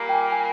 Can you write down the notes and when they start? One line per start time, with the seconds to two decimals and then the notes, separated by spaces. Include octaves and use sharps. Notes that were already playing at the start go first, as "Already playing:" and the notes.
Already playing: A#2 G3 A#3 A#5
0.09 G5
0.14 G#5
0.32 G#5